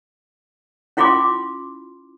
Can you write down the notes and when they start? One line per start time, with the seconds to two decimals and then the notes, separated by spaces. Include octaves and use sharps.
0.97 C#4 E4 F4 B5 C6 D6